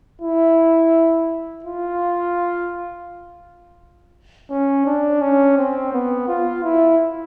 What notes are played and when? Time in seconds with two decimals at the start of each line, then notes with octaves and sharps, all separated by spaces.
0.22 E4
1.64 F4
4.50 C#4
4.86 D4
5.21 C#4
5.57 C4
5.93 B3
6.28 F4
6.64 E4